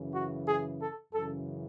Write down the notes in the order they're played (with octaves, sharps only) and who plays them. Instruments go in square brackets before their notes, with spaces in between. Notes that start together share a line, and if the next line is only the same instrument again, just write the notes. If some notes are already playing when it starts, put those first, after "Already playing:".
Already playing: [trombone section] F#2 C#3 E3
F#4
G#4
A4
F#2 C#3 E3 A4